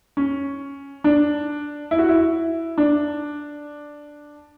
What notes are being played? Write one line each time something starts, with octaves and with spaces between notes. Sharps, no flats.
C#4
D4
E4
F#4
E4
D4